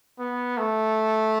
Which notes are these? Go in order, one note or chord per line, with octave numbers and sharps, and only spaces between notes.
B3
A3